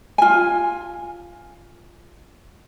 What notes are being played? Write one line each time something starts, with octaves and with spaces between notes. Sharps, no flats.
F4 G#5